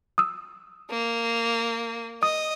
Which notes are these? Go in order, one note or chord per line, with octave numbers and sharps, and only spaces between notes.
D#6 E6
A#3
D#5 D#6